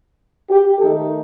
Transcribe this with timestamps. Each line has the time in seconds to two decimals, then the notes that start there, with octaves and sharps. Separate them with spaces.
0.49 G4
0.78 D#3 A3 D#4 A4